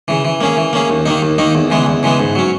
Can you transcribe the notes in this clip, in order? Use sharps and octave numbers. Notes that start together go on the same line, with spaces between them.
C#3 E3
E3
A#3 C#4 G#4
E3
A#3 C#4 G#4
D#2
D#3 A#3 D#4
D#2
D#3 A#3 D#4
E2
C#3 E3 G#3 B3
E2
C#3 E3 G#3 B3
G#2
F#3 C#4